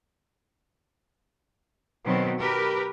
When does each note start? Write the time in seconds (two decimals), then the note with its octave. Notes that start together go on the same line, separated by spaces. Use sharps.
2.06 B2 D#3 F#3 C4
2.40 G4 A#4 B4